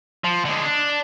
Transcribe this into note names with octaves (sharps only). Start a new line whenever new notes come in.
F3
D3 G#3
D4